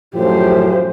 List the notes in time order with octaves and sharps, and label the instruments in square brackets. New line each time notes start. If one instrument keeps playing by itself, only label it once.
[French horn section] F#2 A2 F3 [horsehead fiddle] G4 C5